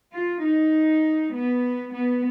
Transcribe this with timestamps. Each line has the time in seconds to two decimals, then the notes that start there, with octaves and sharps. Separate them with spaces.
0.12 F4
0.43 D#4
1.32 B3
1.92 B3